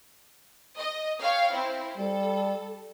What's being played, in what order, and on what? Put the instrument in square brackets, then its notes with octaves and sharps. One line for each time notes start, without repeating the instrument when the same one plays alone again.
[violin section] D#5
C#5 F5 G5
C4 E4
[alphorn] G3 [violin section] A4